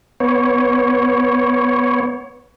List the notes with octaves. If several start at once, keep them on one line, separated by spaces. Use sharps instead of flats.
B3 C#5